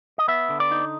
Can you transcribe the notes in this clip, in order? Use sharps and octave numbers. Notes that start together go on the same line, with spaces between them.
D#5
B3 E5
D3
D5
D#4